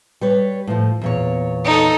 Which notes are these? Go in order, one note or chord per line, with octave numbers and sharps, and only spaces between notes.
G3 B4 C#5
A2 F3
E2 A#2 C#5
D#4 A4